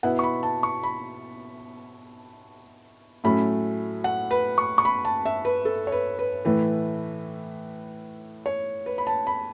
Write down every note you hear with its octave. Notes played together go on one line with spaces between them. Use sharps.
B2 B3 E4 F#5
C#6
B5
A5
C#6
B5
A2 F#3 A3 C#4 B5
F#5
B4
C#6
C#6
B5
A5
E5
B4
A4
C#5
B4
B4
A2 E3 A3 E4 B4
C#5
B4
B5
A5
B5